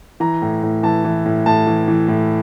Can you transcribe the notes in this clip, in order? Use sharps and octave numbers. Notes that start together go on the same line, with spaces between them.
E3 A#5
A2
A2
E3 A5
E3
A2
A2 A5
E3
E3
A2